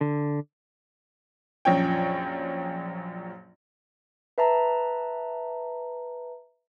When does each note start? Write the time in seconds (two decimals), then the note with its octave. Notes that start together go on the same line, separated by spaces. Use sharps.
0.01 D3
1.65 A#1 F#2 F3 C#5 G5
4.38 B4 E5 A5 A#5